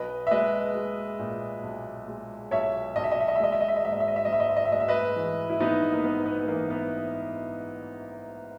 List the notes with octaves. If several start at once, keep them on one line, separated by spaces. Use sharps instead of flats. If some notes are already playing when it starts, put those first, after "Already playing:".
Already playing: B1 B4 D#5
E5
G#3 B4 D#5
G#3
A#2
B1
G#3
B1 C#5 E5
B1 D#5
E5
D#5
E5
D#5
E5
G#3 D#5
E5
D#5
E5
D#5
G#2 E5
D#5
E5
D#5
E5
G#2 D#5
E5
D#5
E5
D#5
E5
G#3 D#5
E5
B4 D#5
E3
E4
A#1 B3 D#4
A#3
G#2 B3
B3
B3
E3 A#3
B3